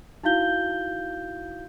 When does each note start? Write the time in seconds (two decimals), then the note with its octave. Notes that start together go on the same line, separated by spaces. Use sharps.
0.23 D#4 E4 F#4 F5 G6 G7